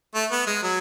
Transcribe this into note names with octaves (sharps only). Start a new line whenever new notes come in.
A3
B3
G#3
F#3